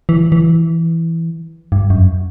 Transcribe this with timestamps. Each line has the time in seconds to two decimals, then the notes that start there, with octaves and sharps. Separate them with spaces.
0.09 E3
0.32 E3
1.72 G2
1.90 F#2